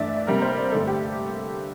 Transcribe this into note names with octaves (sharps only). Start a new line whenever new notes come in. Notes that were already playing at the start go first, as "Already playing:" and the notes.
Already playing: G2 E3 A3 D5 E5
D5
C3 G3 A#3 A#4
C5
D5
G2 D3 A3 A4
G4